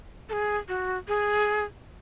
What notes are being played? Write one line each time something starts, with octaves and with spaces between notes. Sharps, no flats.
A4
G#4
F#4
G#4